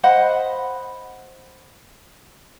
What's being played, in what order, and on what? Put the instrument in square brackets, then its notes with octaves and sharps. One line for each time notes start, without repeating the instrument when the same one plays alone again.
[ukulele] C5 D#5 F#5 B5